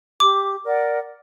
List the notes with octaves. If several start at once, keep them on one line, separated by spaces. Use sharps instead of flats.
G4 D6
A#4 D5 F#5